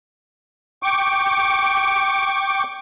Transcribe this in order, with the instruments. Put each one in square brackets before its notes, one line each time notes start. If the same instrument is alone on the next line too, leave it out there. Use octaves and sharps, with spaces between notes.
[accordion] G5 C#6 D6